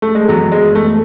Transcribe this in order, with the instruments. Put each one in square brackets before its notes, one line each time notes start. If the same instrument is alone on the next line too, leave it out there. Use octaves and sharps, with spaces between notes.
[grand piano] A3
G#3
[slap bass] F#2 E3 B3 [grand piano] F#3
[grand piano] G#3
A3